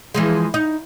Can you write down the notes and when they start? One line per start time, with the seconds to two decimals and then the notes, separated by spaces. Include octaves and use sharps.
0.14 E3 F3 G#3
0.54 D#4